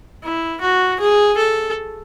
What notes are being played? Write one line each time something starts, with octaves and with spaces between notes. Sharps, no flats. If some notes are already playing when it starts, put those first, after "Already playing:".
E4
F#4
G#4
A4